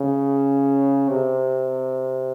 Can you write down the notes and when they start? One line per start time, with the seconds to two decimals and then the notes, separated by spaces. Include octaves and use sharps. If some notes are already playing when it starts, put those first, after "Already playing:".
Already playing: C#3
1.09 C3